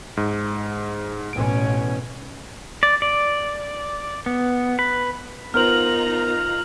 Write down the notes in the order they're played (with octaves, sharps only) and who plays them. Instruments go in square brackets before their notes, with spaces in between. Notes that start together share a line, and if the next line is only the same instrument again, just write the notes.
[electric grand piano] G#2
[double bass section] A1 B2 C#4 [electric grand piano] D7
[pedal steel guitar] D5
D5
B3
B4
[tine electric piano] B3 A#4 C5 [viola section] D#4 F4 A#5 [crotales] F6 F#7